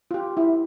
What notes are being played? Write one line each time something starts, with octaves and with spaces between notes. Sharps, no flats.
F4
G4
E4